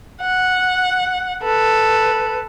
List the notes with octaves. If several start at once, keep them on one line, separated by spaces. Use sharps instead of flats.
F#5
A4 B4